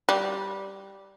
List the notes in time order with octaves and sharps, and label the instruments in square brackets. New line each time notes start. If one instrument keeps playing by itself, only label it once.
[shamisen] G3